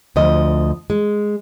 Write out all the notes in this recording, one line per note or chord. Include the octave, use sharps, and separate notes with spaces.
D2 F3 D#5
G#3